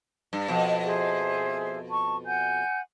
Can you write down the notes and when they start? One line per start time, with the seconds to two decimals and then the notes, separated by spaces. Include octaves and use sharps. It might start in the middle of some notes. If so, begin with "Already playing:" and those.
0.33 G2
0.48 F2 B2
0.84 G#4 C5 E5
1.90 A5 C#6
2.26 F#5 G#5 G6